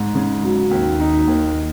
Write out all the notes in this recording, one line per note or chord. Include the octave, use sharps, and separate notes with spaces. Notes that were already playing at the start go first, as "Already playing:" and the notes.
Already playing: G#2
C#3
F#3
D#2
D#4
D#2